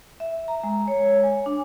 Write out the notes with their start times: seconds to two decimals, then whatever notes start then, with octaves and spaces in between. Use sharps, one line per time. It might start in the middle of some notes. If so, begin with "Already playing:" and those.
0.20 E5
0.48 A#5
0.63 G#3
0.88 C#5
1.23 G#5
1.46 D4